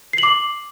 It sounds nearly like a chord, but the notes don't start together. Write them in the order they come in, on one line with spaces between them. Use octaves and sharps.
C7 F#7 D6